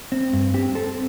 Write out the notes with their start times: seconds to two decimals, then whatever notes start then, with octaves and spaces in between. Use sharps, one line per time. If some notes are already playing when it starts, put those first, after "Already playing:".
0.12 C4
0.33 G2
0.54 C4 G4
0.75 C4 A4